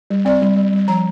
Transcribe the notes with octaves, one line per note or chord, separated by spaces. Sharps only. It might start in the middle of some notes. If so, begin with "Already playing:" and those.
G3
C4 D5
G3
G3
G3
F3 A#5